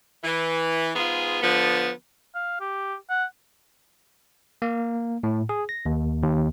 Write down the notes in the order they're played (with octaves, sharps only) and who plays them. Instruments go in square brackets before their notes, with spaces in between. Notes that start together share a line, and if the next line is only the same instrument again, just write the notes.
[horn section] E3
G#2 B3 F4 G#4
D3 F3 B3
[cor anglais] F5
G4
F#5
[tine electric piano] A#3
A2
G#4
A#6
D#2
D#2